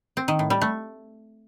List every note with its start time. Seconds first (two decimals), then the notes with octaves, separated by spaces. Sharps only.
0.17 C4
0.28 D#3
0.39 A2
0.50 G3
0.62 A3